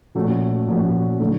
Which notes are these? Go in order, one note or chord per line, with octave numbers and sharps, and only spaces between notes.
A#2 F3 A3 C#4 F#4
A#2 F3 A3 C#4 F#4
D3 F#3 A3